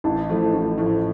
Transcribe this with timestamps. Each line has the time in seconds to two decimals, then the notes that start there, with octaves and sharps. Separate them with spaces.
0.04 A1 A5
0.29 A2 F3 A3
0.53 A1
0.78 A2 F3 A3